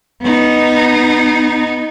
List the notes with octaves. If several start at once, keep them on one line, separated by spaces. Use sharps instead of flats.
B3 D#4